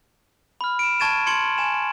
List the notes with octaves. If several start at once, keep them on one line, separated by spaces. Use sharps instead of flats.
B5 F6
D7 E7
A5 C#6 G#6 A6 D#7 E7
C6 G#6 C#7 F#7 G7
G#5 E7